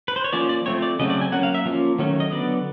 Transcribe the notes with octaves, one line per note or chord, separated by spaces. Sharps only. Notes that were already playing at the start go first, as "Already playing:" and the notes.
B4
C5
C#5
F3 A#3 C#4 D5
D5
F3 A3 C4 C#5
D5
C#3 F#3 A3 C4 D#5
D5
G#5
F#3 A#3 C#4 F#5
F5
E5
F3 A#3 C#4
D#3 F#3 A3 C#4
D#5
D3 F#3 B3 D5